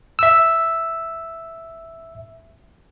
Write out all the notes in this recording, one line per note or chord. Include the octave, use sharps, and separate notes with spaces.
E5 E6